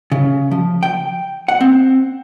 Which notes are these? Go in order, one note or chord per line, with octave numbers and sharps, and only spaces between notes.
C#3
F3
G5
F#5
C4